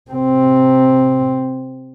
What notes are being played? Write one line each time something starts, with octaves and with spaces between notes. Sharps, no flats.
C3 C4